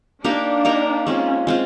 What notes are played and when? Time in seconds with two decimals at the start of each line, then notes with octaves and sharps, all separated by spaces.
0.24 A#3 D4 D#4 G4 A#4
0.65 A#3 D#4 G4 A#4
1.06 G#3 C4 C#4 F4
1.47 G#3 C4 F4